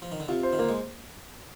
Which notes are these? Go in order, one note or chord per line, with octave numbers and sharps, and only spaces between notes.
F3
D#3
D3
C3 F4
C5
D#3
D3 A#3
G#3